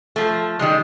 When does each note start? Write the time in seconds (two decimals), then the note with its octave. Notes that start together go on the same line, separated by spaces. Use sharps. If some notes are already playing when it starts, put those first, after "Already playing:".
0.16 F3 A3
0.59 D#3 G3 G#3